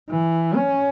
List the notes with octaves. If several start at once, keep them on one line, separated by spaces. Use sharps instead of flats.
E3
C#4